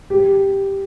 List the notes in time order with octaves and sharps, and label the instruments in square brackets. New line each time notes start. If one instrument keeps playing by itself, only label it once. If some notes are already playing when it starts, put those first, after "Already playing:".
[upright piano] G4